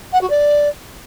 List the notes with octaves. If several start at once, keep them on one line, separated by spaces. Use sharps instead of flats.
F#5
F#4
D5